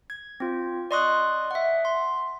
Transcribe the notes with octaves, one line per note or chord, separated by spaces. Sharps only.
G#6
C4 F4
D5 D#5 C6 C#6 D#6 F#6
E5 F#5
C6